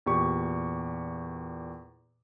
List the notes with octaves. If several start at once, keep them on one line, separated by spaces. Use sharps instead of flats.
E2 A#2 G4 C#6